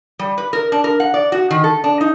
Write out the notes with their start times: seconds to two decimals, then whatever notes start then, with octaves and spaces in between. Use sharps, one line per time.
0.19 G3
0.38 B4
0.53 A#4
0.72 D4
0.84 A#4
1.00 F#5
1.14 D5
1.32 F#4
1.50 D#3
1.64 A4
1.84 D4
2.01 D#4